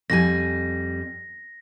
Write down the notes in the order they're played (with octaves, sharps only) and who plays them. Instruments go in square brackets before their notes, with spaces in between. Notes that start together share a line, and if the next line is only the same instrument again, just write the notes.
[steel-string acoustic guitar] F2 G3 G#5 [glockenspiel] A#6